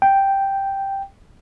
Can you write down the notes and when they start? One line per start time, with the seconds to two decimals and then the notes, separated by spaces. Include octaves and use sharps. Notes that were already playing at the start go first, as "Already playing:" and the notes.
0.02 G5